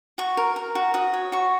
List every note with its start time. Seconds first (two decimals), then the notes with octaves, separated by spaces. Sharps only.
0.18 F#4 C#6
0.37 A#4
0.56 A#4
0.75 F#4
0.94 F#4 D#6
1.14 C#5
1.32 F#4 C#6